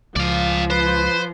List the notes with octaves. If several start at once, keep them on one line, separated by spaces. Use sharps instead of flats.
C#2 F3 D5 F5
B4 C5